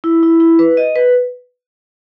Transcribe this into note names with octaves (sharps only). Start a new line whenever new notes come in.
E4
E4
E4
B4
D#5
B4